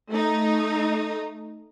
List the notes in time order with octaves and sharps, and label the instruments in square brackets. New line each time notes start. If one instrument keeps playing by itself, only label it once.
[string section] A3 D#4